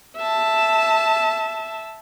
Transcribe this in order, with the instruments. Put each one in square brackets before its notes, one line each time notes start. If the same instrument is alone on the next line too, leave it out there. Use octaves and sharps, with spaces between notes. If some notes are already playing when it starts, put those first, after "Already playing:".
[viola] E5 A5